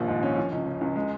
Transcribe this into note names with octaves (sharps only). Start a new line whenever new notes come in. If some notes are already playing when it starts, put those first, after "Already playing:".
Already playing: A#1 D#2 F3
G#2
C#4
F3
C#2
C#3
C#2
G#3